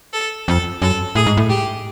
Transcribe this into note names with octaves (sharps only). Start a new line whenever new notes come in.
A4
F2 A4
F#2 A4
A2 G#4
G#2
A2
G4